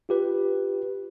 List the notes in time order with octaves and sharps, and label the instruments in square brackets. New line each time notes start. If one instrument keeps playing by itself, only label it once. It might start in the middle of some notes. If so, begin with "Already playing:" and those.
[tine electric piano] F4 G4 B4